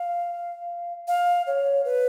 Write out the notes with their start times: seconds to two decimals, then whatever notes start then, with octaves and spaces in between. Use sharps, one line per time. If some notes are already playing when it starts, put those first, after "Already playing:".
Already playing: F5
1.08 F5
1.47 C#5
1.85 B4